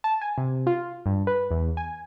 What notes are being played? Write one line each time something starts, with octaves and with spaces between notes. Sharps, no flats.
A5
G#5
C3
F4
G2
B4
E2
G#5